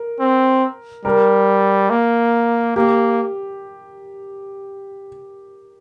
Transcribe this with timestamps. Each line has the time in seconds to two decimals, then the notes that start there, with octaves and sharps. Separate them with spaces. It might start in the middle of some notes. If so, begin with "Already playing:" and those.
Already playing: A#4
0.20 C4
1.05 G3 A#4
1.90 A#3
2.76 A#3 G4